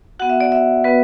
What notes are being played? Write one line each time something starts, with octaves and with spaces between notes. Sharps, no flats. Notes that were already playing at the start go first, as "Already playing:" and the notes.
B3 F#4 F#5
E5
D5
E5
B3 F#4 B4